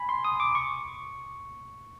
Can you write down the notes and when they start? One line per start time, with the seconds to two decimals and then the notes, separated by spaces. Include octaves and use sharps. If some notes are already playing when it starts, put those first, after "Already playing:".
Already playing: G#5 B5
0.09 C6
0.24 D#6
0.40 D6
0.55 C#6